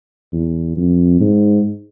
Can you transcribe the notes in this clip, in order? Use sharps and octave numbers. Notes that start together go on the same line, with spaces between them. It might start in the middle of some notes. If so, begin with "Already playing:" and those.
E2
F2
G#2